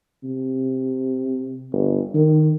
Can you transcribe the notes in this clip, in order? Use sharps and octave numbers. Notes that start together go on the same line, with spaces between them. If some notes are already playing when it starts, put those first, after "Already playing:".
C3
G1
D#3